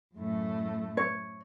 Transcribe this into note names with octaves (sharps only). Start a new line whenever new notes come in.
F#2 A2 A3
C#5